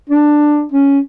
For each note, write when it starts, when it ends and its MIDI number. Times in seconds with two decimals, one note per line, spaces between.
0.10 0.66 62
0.72 0.99 61